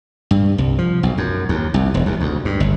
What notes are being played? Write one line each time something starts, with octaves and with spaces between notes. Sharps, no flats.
G2
C2
F3
B1
F#2
D#2
C2
E1
D#2
D2
G2
G1